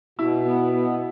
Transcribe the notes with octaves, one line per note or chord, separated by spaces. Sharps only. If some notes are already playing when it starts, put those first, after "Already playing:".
B2 E4
B3
B3